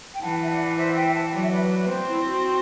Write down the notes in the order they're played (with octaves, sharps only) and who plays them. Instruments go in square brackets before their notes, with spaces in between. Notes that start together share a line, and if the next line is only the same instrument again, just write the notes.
[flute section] G5
[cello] E3 [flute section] F#5 A5
[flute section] E5
D5 F#5
C5 E5
E5 G5
F#5 A5
[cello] F#3 [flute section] D5 F#5
[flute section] E5
B4 D5
B4 D5
[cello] C4 [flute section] C5
[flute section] E4
F#4